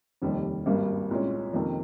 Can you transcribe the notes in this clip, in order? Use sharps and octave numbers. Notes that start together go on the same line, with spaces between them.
F1 D#2 D#3 G3
G#1 G2 G3 A#3
C2 A#2 G#3 C#4
F2 C3 D#3 A#3